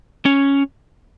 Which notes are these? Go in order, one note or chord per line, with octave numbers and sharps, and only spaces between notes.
C#4